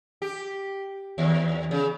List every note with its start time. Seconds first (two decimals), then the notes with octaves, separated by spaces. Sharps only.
0.22 G4
1.18 D#2
1.71 C#3